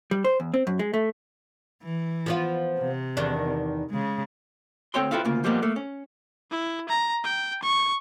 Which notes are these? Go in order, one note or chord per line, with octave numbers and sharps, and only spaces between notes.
G3
C5
E2
C4
F#2
G#3
A3
E3
F3 B3 F4
C3
E2 D#3 D4
C#3 G#3
D2 C4 A4 C#5 G5 C6
C4 E4 F4 A4 B4 F5
D2 C#3 A#3 F4
F3 G3 G#3 A#3 B3
A3 A#3
C#4
E4
A#5
G5
C#6